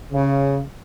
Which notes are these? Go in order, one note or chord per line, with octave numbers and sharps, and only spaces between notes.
C#3